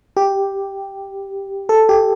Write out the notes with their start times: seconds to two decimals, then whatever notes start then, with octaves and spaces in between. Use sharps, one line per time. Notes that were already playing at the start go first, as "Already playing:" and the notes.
0.17 G4
1.69 A4
1.89 G4